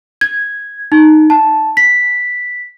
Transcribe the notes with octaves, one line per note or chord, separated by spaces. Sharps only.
G#6
D#4
A5
B6